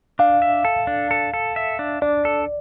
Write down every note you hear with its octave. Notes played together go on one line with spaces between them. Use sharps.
D4 F5
E5
A4
D4
A4
A4
E5
D4
D4 D5
A4